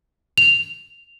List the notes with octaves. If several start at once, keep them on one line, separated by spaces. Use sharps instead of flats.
F7